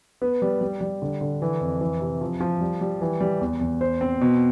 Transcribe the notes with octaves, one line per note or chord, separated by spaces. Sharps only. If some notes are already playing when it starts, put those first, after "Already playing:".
B3
G3
G3
G3
D3
D3
E3
F2
E3
C3
F3
F3
G3
G3
E3
G3
E2
E2
C5
C4
B2